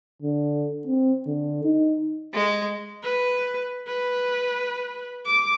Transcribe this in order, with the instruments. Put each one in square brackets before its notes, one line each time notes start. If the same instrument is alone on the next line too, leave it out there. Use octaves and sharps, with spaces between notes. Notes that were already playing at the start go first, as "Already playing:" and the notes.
[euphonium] D3
C4
D3
D#4
[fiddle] G#3
[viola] B4
B4
D6